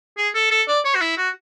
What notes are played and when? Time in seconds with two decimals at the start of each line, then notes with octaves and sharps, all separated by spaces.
0.17 G#4
0.35 A4
0.51 A4
0.68 D5
0.85 C#5
0.95 F#4
1.01 E4
1.18 F#4